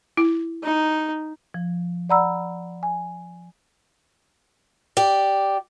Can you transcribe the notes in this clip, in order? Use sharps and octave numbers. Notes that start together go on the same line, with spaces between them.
E4
D#4
F3
D5 F#5 A#5 B5 E6
G#5
G4 D5